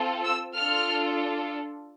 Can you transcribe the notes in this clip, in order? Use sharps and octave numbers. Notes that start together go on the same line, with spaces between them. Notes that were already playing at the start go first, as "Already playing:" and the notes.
Already playing: C4 F4 A4
E6
D4 F4 A4 F6